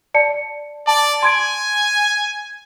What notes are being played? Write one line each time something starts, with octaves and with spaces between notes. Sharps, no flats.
D5 A5 C#7
D5 A5
G#5 C6 G#6 D7